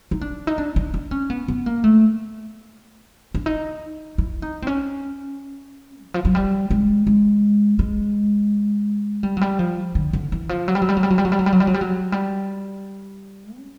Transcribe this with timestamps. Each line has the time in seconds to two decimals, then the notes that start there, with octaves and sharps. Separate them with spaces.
0.11 D#4
0.21 D4
0.47 D#4
0.58 D4
0.76 D4
0.94 D4
1.11 C#4
1.30 B3
1.48 B3
1.66 A#3
1.84 A3
3.34 D4
3.46 D#4
4.18 E4
4.42 D#4
4.62 C4
4.67 C#4
6.04 E3
6.14 F3
6.25 F#3
6.35 G3
6.70 G#3
7.07 G#3
7.79 G#3
9.23 G3
9.37 F#3
9.41 G3
9.59 F3
9.95 D3
10.13 D3
10.32 E3
10.49 F3
10.68 F#3
10.75 G3
10.82 F#3
10.89 G3
10.97 F#3
11.03 G3
11.10 F#3
11.18 G3
11.25 F#3
11.32 G3
11.39 F#3
11.46 G3
11.53 F#3
11.60 G3
11.67 F#3
11.74 G3
11.81 F#3
12.12 G3
13.56 C#4